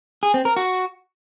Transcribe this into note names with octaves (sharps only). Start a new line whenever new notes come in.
G#4
C4
A#4
F#4